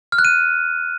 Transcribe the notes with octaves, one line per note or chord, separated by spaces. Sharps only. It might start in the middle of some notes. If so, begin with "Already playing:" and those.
F6
F#6
D#7